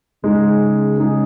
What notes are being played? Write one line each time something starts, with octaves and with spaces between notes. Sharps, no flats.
C#3 G#3 D#4 G#4
G#3 D#4 G#4